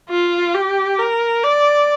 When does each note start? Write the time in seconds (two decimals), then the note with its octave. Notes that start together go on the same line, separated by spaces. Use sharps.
0.10 F4
0.55 G4
0.99 A#4
1.44 D5